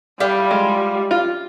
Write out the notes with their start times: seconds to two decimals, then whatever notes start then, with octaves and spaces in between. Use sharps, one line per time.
0.20 G3 E4 F4 G4 D5
0.51 G#3
1.11 F4